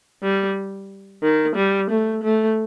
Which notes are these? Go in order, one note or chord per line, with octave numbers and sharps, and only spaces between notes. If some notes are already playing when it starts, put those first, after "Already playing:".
G3
D#3
G3
A3
A3